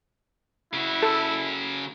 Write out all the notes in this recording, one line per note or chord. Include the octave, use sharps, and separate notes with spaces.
C#3 E4 F#4
A4